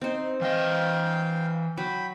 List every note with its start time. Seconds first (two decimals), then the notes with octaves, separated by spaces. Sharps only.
0.01 C4 D#4 C5
0.41 E3 D#5 F5 G5
1.77 F#3 G5 B5